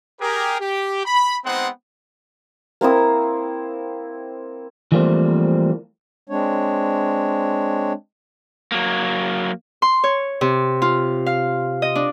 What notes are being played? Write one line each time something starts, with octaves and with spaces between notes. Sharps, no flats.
G4 G#4 A#4
G4
B5
G#3 B3 C4 D#4 C5 F#5
A#3 C4 E4 D#6
E3 F3 G3 A3 A#3 C4
G#3 C4 D4 C#5
F#3 A#3
C6
C#5
C3
F4
F5
D#5
D4